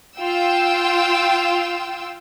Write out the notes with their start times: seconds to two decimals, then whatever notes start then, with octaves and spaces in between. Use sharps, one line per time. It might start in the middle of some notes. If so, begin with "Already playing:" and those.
0.19 F4 G5 E6